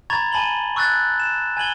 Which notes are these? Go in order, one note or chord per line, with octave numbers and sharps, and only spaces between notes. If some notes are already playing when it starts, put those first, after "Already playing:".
A#5 B5 C#6 G#6 A6 F7
G#5 A5 B5 F#7 G7
C#6 E6 F#6 G#6 A6
E7
G#5 G#6 F#7 G7